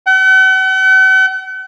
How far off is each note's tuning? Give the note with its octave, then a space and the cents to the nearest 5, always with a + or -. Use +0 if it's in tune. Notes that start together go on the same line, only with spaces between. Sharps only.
F#5 +45